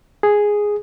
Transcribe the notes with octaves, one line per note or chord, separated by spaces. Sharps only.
G#4